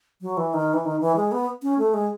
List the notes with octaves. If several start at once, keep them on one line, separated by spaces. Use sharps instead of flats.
F#3
E3
D#3
E3
D#3
E3
G#3
B3
C#4
A3
G#3